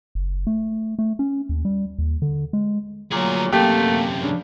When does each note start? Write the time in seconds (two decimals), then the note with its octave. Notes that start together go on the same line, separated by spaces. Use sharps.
0.15 F#1
0.47 A3
0.99 A3
1.19 C#4
1.49 D#2
1.65 G3
1.99 D#2
2.22 D3
2.53 G#3
3.12 D2 A#2 F#3 G#4
3.52 F#2 C3 A3 A#3 G4
4.21 C#3 D4